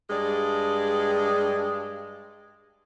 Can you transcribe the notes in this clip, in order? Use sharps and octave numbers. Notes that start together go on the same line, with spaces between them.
G2 G#3 D5